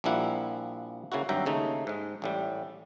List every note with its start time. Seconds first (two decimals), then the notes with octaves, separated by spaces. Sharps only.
0.04 A#1 F3 G3 A#3 E4 F#5
1.12 C#3 A#3 E4 F#4
1.29 G#1 G2 F#3 E5 G5 A#5
1.46 D#2 C#3 A3 D#4
1.87 G#2 G#3
2.22 A1 A2 G3